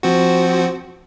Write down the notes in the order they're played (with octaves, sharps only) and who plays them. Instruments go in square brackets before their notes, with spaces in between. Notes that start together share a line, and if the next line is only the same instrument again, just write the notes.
[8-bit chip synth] F3 C4 F#4